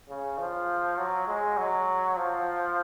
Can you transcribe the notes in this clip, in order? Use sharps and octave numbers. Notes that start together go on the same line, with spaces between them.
C#3
F3
F#3
G#3
F#3
F3